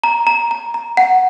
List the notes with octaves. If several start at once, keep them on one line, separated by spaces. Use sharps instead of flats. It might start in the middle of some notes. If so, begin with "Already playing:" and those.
A#5
A#5
A#5
A#5
F#5